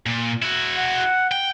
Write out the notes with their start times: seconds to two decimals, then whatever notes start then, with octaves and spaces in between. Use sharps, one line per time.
0.06 A#2
0.42 E4 F#4
0.77 F#5
1.32 G5